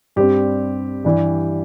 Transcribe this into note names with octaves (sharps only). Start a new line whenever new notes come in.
G2 G3 C4 G4
G2 E3 G3